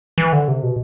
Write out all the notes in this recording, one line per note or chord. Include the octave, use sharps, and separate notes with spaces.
E3
D3
C3
B2